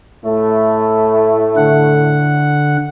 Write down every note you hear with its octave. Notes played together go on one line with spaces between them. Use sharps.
A2 A3
D3 F#5